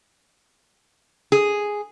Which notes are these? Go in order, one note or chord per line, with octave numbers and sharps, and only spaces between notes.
G#4